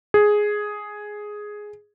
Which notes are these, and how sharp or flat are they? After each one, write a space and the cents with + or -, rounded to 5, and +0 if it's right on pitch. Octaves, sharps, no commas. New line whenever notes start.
G#4 +5